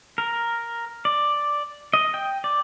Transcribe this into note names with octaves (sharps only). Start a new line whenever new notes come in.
A#4
D5
D#5
G5
D5